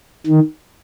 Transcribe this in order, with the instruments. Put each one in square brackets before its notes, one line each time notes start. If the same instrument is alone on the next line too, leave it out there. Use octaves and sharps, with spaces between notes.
[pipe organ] D#3